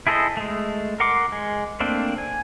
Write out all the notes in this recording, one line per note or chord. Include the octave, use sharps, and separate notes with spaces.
E4 G#4 A4 C5 D#5
G#3 A3
A#4 F#5 C6 D6
G#3
A3 A#3 C4 D4
G#5